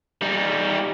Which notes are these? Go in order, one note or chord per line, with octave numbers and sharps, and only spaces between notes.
G3 D#4